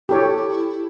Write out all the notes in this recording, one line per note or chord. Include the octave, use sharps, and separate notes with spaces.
E4 G4 A4 C#5